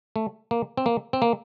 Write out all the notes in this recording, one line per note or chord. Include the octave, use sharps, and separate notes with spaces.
A3
A#3
C4
A#3
C4
A#3